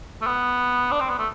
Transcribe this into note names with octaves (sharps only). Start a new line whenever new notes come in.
A3
B3
D4
C4
B3
A3